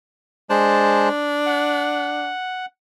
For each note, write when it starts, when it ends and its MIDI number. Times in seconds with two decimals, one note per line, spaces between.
0.50 1.09 56
0.50 2.30 62
0.50 1.09 72
0.50 1.09 81
1.46 2.66 78